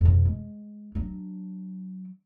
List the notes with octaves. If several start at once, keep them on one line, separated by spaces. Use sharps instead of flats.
F2 B2
G#3
F#3 D4